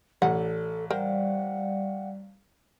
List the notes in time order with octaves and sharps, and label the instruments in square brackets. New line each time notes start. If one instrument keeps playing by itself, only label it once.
[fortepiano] A1 [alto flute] A4 [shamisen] D5 F#5
[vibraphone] G3 D5 F5 [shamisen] A#4 C5 [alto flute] F#5